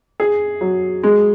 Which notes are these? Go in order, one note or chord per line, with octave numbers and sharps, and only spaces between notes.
G#4
F#3
G#3